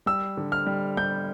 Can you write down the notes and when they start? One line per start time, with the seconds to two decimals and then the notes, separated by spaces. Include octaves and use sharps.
0.06 G3 E6
0.37 D3
0.52 F6
0.66 G3
0.97 G3 G6